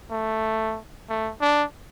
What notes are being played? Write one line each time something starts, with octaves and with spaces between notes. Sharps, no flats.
A3
A3
D4